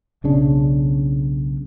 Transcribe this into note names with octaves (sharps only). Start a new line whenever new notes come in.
B1 C#3 D4